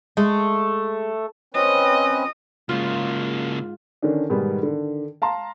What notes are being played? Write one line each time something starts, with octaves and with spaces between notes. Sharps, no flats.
G#3 A3
C4 C#4 B4 D#5
G#2 C#3 A#3 F4
D3 D#3 C#4 D4
G#2 B2 D#3 G3 B3
D3 D#3
F5 A5 A#5 C6